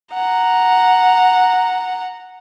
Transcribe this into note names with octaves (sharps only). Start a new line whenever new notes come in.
F#5 A#5